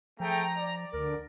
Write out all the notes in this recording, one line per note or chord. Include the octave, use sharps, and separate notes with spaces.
F3 A3 G#4 G5 A#5
D5
D2 D3 A#4